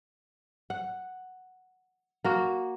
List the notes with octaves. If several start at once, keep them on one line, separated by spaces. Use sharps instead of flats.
F#5
A#3 F#4